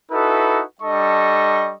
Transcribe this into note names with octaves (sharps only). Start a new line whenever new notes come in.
D#4 E4 F#4 A4 B4
G3 D4 A4 D#5 C#6